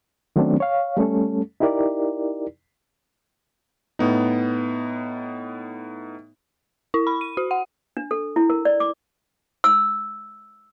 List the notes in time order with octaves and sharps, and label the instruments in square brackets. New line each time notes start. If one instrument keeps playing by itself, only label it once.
[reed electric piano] D#3 F#3 A3 B3 C4 D4
C#5 F5
G3 A3 C#4 A4
D#4 E4 G4 A#4 D5
[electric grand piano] A2 B3 D#4
[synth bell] E4
B5
D#7
F#4
F#5
[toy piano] D4
A4
E4
A#4
D5
D6
E6